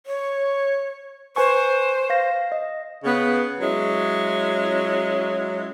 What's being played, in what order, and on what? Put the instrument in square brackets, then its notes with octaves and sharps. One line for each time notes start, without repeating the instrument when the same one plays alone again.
[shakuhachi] C#5
[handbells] B4 G#5 C#6 [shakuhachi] C5
[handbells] F5 A#6
D#5
[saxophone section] C#3 B3
F#3 G#3 C#4 E4